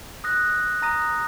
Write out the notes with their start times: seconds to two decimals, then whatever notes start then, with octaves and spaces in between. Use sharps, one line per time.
0.24 D#6 F#6 A#6
0.82 A#5 D#6 A#6 D#7